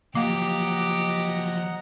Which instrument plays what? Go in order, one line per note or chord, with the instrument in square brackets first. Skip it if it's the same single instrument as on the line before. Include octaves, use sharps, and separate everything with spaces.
[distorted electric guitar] F3 F#3 [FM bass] A#3 [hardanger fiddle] G4 [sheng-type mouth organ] D#5 F#5 A#5